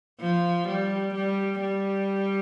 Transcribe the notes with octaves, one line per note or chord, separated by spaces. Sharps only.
F3
G3
G3
G3